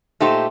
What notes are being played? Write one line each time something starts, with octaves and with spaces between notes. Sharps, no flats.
A#2 A3 D#4 G4 C5